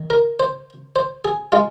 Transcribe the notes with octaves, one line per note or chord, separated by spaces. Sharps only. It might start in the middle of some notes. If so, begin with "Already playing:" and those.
Already playing: D#3
A#4
C5
C5
G#4
G#3 F4